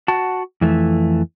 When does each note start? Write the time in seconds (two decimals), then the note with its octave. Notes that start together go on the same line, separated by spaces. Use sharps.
0.08 F#4 F#5 A5
0.61 F2 E3 A3